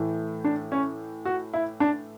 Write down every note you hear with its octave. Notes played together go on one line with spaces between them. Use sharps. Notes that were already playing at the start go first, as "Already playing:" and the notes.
Already playing: A2 E3 A3
D4
C#4
F#4
E4
D4